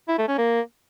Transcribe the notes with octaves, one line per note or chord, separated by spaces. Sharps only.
E4
A3
C#4
A#3